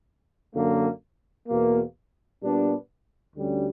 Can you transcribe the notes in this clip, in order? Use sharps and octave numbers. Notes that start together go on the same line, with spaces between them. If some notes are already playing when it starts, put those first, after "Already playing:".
F#2 D3 A#3
E2 B2 A#3
A#2 G3 B3 D4
D2 D3 G3 C#4